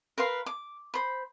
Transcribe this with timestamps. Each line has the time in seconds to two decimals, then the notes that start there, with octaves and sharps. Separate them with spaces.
0.18 A#4 B4 F5 C6
0.46 D6
0.94 C5 B5